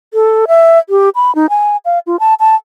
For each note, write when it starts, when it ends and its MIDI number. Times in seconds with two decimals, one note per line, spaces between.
0.14 0.45 69
0.48 0.79 76
0.90 1.09 67
1.15 1.34 83
1.35 1.46 63
1.50 1.77 80
1.85 1.99 77
2.07 2.16 65
2.20 2.34 81
2.40 2.56 81